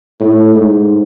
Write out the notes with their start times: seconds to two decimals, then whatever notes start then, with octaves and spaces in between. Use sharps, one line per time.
0.20 A2
0.55 G#2